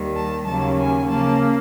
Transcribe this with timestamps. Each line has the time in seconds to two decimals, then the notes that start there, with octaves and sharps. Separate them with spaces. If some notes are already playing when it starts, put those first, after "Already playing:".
Already playing: D#2 D#3 G3
0.15 A5
0.46 D#2 C#3 F#3 A#3 A5
0.78 G#5
1.08 C#3 F3 A#3 A5